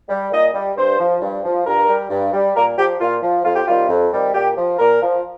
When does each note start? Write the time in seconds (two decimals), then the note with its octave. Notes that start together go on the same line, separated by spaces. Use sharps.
0.09 G3
0.31 A#2 D#5
0.54 G3
0.77 G2 C5
0.99 F3
1.21 G2
1.44 F3
1.66 G2 A#4
1.89 G3
2.10 G2
2.33 G3
2.56 A#2 A#4
2.78 F3 G4
3.00 A#2 F4
3.22 F3
3.44 F2 F4
3.56 G4
3.67 C3 D#3 G3 F4
3.89 F2
4.12 C3 D#3 G3
4.34 A#2 G4
4.57 F3
4.79 A#2 A#4
5.01 F3